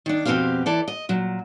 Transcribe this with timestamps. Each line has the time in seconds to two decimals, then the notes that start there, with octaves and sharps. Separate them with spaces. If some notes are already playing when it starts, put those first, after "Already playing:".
0.06 D#3 D4
0.25 F2 B2 C4 G4 C5 F5
0.66 E3 A4 D5
0.88 D#5
1.09 A#2 F#3